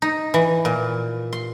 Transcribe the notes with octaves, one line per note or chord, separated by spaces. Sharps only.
D#4
E3
A#2
C6